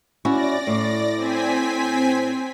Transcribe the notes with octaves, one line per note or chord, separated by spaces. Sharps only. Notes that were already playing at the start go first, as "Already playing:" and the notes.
C#4 E4 F#4 D5 A#6
A2
C4 G#5 B6